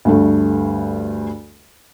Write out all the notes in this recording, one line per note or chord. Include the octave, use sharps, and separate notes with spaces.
D2 G2 A3